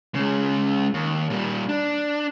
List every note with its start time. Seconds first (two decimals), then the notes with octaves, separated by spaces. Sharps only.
0.15 C#3 G#3
0.94 D#2
1.30 A#2 G3
1.69 D4